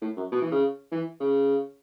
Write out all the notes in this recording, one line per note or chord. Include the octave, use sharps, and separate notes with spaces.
A2
F#2
B2
E3
C#3
E3
C#3